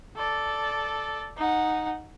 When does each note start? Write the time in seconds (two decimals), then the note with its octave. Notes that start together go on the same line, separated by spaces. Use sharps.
0.16 A4 D5
1.37 D#4 F#5